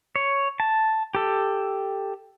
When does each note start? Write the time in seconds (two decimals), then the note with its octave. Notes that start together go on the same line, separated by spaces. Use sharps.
0.16 C#5
0.60 A5
1.15 G4 A4